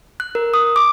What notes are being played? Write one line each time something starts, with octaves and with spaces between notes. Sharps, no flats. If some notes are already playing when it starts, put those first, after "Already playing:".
F#6
A#4
D#6
D6